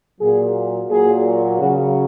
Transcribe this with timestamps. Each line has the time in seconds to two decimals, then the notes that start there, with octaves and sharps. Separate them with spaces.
0.20 A#2 F#3 G#4
0.90 A#2 F#3 G#4
1.59 C#3 F#3 F#4